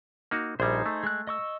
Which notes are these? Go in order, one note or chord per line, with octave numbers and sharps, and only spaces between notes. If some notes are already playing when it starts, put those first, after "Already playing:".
A#3 D#4 F#4
A#1 G3 D#4 G#4 C5
A3
G#3 F#6
D#5 C#6 E6